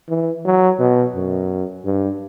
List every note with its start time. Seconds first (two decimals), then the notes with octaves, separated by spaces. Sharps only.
0.09 E3
0.45 F#3
0.79 B2
1.15 F#2
1.85 G2